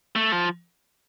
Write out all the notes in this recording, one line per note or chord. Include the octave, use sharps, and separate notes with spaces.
A3
F3